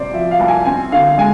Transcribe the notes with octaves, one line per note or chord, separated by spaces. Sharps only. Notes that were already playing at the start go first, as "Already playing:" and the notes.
Already playing: C2 C3 C5 D5
F3 E5
F5
C2 A5
G#5
C4 G#5
D3 F5
G#3 G#5